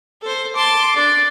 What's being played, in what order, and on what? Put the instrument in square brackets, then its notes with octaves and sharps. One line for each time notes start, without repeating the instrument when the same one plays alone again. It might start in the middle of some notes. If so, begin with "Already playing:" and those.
[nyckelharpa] A4 C5
[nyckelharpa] A5 C6 [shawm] D6
[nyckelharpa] D4 [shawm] D5